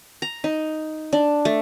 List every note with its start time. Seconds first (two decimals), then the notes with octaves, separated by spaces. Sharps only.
0.22 A#5
0.44 D#4
1.13 D4
1.45 A3